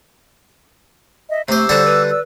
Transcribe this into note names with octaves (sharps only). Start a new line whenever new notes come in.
D#5 E5
C3 A3 C5 D6 E6
D3 G3 F#4 C5
B4
D5 E6